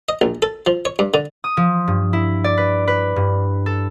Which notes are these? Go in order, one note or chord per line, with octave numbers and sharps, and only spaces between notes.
D#5
A#1
A4
F3
C#5
G2
D3
D#6
F3
G2
E4
D5
B4
B4
G2
A4